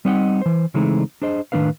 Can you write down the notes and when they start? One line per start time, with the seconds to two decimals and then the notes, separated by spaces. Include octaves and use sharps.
0.05 G3 C4 D#4 G4 D#5 F#5
0.42 E3 C5
0.74 C#3 E3 G#3 A3 C4 D#4
1.22 D4 G#4 C5 D#5
1.52 A2 D#3 C4 D4 B4 F5